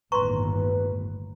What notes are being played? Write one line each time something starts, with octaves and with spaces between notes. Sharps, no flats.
G1 D#2 A2 B4 A#5 C6 C#6